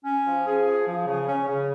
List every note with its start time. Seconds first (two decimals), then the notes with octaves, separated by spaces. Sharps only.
0.04 C#4
0.26 F3
0.46 G#4
0.66 F3
0.87 F3
1.06 C#3
1.27 C#4
1.47 C#3